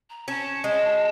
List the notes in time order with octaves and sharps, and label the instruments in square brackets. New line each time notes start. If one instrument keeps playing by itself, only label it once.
[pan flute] A#5
[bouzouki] C#4 [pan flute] A5
[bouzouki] G#3